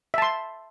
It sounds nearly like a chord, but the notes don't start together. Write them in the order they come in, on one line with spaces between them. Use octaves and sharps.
E5 A5 C6